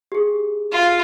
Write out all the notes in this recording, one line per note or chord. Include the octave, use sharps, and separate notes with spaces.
G4 G#4
F4